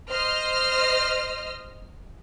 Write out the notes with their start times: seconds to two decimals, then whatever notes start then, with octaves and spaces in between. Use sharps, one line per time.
0.11 C5 D#5 F6